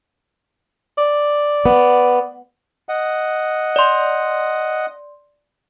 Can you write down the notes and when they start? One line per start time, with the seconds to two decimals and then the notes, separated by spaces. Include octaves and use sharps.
0.98 D5
1.66 B3
2.88 D#5 F#5
3.76 D5 C6